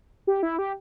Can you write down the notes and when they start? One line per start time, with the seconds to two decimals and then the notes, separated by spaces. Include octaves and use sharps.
0.27 G4
0.43 E4
0.59 G4